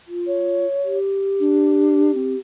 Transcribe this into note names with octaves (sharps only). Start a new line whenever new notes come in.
F4
C#5
G4
D4
C4